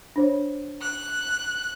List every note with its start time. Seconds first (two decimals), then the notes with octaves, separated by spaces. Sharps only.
0.16 D4 C5 C#5
0.81 F#6